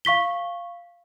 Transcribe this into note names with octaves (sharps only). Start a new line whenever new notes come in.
F5 C#6 B6 G7